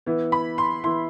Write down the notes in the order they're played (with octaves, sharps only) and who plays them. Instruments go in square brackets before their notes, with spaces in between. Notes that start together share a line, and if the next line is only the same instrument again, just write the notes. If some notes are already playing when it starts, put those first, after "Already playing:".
[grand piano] E3 B3 E4
B5
C6
E3 B3 E4 C6